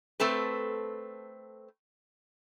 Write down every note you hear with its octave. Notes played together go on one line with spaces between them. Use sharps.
A3 C4 A4 B4